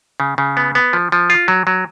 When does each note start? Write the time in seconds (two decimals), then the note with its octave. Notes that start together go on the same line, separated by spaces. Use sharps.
0.20 C#3
0.38 C#3
0.57 B3
0.75 B3
0.93 F3
1.12 F3
1.30 F4
1.48 F#3
1.67 F#3